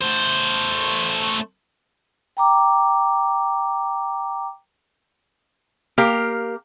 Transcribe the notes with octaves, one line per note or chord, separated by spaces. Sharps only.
A3 C5
G5 A#5 D6
A#3 G4 A#4 F5